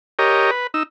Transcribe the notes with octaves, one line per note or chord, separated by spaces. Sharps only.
G4 A#4 C#5 D#5
B4
D#4 E6